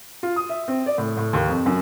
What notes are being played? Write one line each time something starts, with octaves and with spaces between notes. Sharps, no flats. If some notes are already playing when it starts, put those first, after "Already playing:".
F4
D#6
E5
C4
D5
A2
A2
D#2
F2
F#2